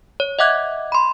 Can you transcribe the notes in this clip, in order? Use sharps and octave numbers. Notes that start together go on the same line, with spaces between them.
C#5
D#5 E5 F#5 D6 F#6 G#6
B5 C6